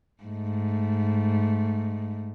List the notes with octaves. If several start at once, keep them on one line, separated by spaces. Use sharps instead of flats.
G#2 A3